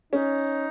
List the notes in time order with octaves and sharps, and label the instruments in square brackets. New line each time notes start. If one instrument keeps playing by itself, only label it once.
[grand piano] C#4 [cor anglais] D#4